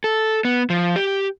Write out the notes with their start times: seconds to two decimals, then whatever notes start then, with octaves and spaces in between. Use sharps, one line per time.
0.04 A4
0.45 B3
0.70 F3
0.96 G4